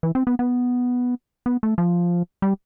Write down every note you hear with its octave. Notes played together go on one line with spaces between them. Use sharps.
E3
C4
B3
B3
B3
A3
F3
G3